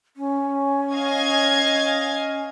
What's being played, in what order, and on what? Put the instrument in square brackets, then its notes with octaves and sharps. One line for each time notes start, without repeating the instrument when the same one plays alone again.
[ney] C#4
[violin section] D#5 F5 G#6